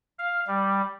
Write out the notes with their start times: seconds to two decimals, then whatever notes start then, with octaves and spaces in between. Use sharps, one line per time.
0.19 F5
0.47 G3